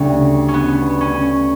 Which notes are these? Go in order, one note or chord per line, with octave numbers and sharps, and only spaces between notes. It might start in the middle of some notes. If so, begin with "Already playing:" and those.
Already playing: D2 C#3 G3 C#4
C#4
B3
C#4